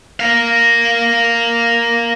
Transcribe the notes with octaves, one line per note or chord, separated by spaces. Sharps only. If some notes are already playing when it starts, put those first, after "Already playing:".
A#4 F5